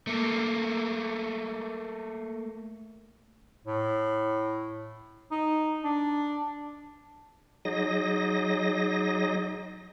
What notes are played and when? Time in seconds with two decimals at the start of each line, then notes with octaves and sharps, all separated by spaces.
0.07 A3 A#3
3.65 A2
5.31 D#4
5.84 D4
7.65 F#3 D#4 G#4 D#5 A#6